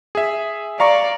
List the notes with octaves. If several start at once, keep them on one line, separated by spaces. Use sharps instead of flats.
G#4 E5
D5 F5 A#5 C#6